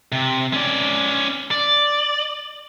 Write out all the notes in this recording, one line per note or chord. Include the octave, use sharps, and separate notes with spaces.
C3
C#4 D5
D5